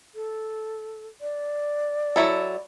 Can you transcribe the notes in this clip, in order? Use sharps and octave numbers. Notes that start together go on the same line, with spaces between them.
A4
D5
F#3 E4 A4